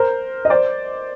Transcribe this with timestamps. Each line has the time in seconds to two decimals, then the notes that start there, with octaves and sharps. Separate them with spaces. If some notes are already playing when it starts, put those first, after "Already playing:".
Already playing: A#4 C5
0.45 D#5
0.50 C5 D5